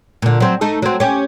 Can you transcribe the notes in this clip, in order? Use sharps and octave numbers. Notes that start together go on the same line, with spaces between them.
A#2 D3
F#3 C4
A3 D#4 A4
F#3 C4
C#4 G4